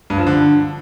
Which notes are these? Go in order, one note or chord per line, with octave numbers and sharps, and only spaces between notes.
G2
F3
D3